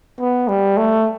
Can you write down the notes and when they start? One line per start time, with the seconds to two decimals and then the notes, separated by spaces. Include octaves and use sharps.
0.20 B3
0.48 G3
0.77 A3